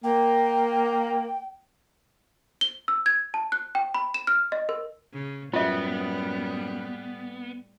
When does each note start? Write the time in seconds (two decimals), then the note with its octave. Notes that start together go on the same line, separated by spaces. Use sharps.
0.04 A#3 G5
2.61 G7
2.88 E6
3.06 G#6
3.34 A5
3.52 F#6
3.75 G5
3.94 B5
4.14 E7
4.27 F6
4.52 D#5
4.69 A#4
5.13 C#3
5.54 F#2 A2 G3 B3 F4 E5